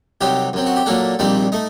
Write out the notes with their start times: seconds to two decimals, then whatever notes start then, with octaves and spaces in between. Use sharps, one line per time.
0.21 C2 C3 F#3 C4 D#4 G4
0.53 F#2 F#3 C4
0.66 F#4
0.76 G4
0.86 A#2 F#3 A#3 D4 A4
1.19 A#1 A#2 G3 C4 D#4
1.52 A3 D#4